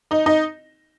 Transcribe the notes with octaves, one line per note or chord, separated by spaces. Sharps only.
D#4 D#5
D#4 D#5